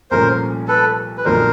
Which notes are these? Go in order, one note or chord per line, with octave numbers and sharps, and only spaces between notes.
C2 A#2 F3 A3 C#4 A#4 C5
A4 B4
B4
B1 A#2 F3 A3 D4 A#4 C5